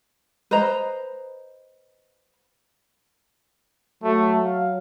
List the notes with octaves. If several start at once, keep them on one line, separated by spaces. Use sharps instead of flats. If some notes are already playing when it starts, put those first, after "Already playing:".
B4 C5 D#5 A#5
F#3 A3
F5